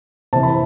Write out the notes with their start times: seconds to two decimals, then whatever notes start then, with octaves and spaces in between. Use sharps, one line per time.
0.33 C3 E3 A5
0.43 B5